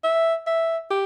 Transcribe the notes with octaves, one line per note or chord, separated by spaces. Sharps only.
E5
E5
G4